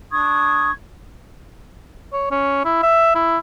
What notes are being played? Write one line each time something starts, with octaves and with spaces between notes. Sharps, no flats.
D4 C#6 D#6 G#6
C#5
C#4
E4
E5
E4